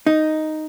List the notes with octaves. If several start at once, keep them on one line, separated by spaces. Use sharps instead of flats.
D#4